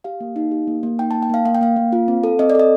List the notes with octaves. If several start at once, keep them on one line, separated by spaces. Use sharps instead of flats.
G4 F5
A#3
D#4
G4
A#3
A#3
D#4 G5
A#3 A5
G5
A#3 F5
A#3 F5
G5
A#3 F5
A#3
F4
C4
A4
C4 D#5
D5
A4 D#5